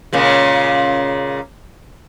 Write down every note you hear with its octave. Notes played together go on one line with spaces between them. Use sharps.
A#2 C#3 G#3